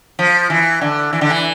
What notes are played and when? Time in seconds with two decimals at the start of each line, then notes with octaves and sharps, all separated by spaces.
0.19 F3
0.50 E3
0.81 D3
1.13 E3
1.21 D3
1.30 E3